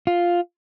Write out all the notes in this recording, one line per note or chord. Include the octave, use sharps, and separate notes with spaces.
F4